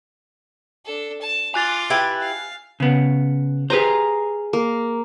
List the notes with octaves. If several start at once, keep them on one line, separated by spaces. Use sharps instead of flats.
D4 A4
A5
F4 G#5 D6 F#6 A6
E4 G4 B4
F5
C#3 B3
G4 G#4 B4 C5 F5 A#5
A#3